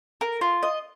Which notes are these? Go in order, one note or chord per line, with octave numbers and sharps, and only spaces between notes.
A#4
F4
D#5